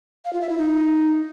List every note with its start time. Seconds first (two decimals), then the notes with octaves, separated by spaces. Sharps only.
0.25 F5
0.33 F4
0.41 E5
0.49 E4
0.58 D#4